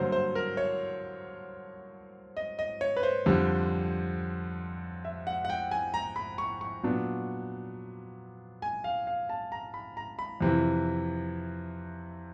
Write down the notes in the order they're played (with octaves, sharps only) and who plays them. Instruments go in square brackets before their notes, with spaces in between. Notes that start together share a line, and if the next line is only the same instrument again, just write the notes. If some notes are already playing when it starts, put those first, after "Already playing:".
Already playing: [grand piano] G2 D3 F#3 A#3 C5 C#5
C5
A#4
C#5
D#5
D#5
C#5
B4
C5
F2 D3 G3
E5
F#5
F#5
G5
G#5
A#5
B5
C#6
C#6
A#2 F#3 B3 D4
G#5
F5
F5
A5
A#5
B5
A#5
B5
F2 C3 E3